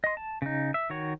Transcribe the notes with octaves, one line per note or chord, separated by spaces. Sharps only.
D#5 C6
A5
C#3 D#4
E5
D#3 F#4 C#5